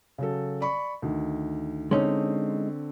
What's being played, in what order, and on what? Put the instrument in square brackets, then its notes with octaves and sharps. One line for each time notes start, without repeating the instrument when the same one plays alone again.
[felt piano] C#3 F#3 A4
D5 B5 C#6
D2 D#3
[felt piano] D3 C4 C#5 [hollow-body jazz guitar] G#3 C#4 D#4